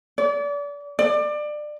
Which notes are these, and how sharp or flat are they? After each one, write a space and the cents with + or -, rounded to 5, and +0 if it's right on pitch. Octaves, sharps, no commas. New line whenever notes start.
D5 -35
D5 +25